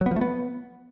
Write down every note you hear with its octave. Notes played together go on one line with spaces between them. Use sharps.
F#3
B3
F3
A3
B3